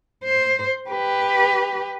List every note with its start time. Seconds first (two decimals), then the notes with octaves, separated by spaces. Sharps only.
0.24 C5
0.90 G4 B4